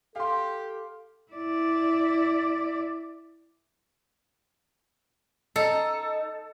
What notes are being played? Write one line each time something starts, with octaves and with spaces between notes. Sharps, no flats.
G4 A4 F5 C6
E4 D5
D#4 A4